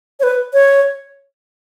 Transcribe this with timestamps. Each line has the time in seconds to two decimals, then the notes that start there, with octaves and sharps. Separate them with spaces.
0.20 C#5
0.23 B4
0.53 C#5